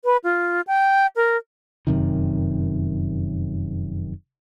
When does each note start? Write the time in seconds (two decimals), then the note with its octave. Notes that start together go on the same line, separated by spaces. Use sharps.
0.05 B4
0.24 F4
0.67 G5
1.16 A#4
1.87 F1 F#2 C3 D#3